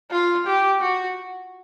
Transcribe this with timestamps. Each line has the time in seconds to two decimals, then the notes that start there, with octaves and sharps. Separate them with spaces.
0.11 F4
0.47 G4
0.82 F#4